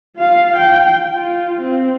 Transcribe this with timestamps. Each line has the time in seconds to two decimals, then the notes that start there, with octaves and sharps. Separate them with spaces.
0.17 F4 F5
0.57 G5
1.15 F4
1.61 C4